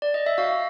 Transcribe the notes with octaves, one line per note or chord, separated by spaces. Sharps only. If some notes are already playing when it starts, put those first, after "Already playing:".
D5
D#5
E5
F#4 F5